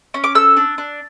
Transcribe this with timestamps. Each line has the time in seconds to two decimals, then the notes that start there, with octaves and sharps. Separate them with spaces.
0.14 C#4
0.24 D6
0.35 A4 E6
0.57 D4
0.78 D4